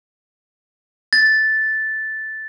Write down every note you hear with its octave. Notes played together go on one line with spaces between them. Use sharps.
A6